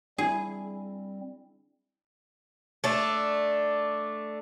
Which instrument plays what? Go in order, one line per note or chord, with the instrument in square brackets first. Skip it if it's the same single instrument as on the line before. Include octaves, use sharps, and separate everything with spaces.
[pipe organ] G3 C4 [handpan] D4 E4 [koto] G#4
[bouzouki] A3 D4